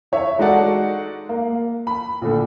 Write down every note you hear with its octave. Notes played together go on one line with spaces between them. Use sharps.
E4 C#5 E5
G#3 D#4 F#4 A4 D5 F#5
A#3
B5
A#1 A2 D3